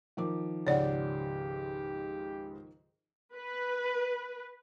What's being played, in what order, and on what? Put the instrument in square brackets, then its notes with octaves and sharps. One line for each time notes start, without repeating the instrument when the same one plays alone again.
[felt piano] D#3 F3 D6
[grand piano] C#2 G#2 [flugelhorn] G4 [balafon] C#5 D5 F#5
[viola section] B4